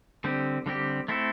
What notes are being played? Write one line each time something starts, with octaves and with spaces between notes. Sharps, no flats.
D3 G3 C4 G4
D3 G3 C4 G4
A3 C4 E4 A4